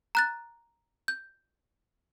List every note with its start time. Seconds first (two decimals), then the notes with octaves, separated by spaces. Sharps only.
0.15 A#5 F#6 A6
1.08 G6